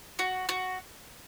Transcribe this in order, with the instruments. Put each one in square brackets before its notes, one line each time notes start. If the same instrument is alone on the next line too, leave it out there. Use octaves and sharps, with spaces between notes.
[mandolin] F#4
F#4